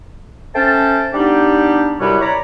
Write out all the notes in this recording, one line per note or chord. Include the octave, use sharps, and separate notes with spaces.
A3 C#4 C5 G5 A5
G3 B3 D4 D#4 G4
F#2 C3 G3 E4 B4 C#5
C#5 D5 A#5 B5